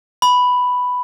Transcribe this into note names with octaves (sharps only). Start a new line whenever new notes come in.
B5